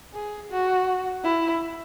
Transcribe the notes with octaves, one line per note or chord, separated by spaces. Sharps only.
G#4
F#4
E4